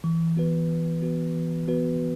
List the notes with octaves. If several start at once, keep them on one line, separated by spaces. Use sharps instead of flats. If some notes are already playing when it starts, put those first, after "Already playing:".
E3
B3 F#4 B4
E3
B3 F#4 B4
E3
B3 F#4 B4